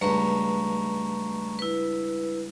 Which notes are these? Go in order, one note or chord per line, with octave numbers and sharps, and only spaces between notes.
C#2 G2 A3 A#5 C#6
E4 B4